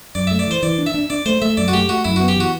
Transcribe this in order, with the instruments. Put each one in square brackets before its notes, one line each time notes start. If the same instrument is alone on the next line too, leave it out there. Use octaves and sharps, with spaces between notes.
[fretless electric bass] F#2 [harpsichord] D5
[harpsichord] E5
[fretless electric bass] A3
[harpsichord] D5
[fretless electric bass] E3 [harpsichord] C5
[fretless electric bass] E3 [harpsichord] D5
[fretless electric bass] D4
[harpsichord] E5
[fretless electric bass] D4
[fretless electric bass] D4 [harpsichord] D5
[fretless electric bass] A3 [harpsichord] C5
[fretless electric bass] A3 [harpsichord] E5
[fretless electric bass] F#2 [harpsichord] D5
[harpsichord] F#4
[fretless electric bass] A3 [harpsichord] G4
[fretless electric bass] A3 [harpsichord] F#4
[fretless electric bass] F#2 [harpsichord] E4
[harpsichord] F#4
[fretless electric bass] B3
[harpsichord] G4
[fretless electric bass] E3 [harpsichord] F#4